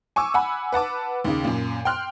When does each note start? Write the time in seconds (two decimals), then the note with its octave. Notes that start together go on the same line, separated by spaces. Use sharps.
0.16 G#5 C#6 D6 E6
0.34 F#5 G#5 B5
0.72 B4 F#5 A5 D6
1.25 D#2 C#3
1.44 F#2 A#2
1.85 G5 C6 F6 F#6